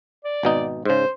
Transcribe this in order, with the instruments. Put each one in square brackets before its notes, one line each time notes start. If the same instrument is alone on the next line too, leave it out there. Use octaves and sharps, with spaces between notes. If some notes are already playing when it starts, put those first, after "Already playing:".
[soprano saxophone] D5
[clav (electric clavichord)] G#1 B2 D#4
[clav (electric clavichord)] G#2 C#3 [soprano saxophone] C5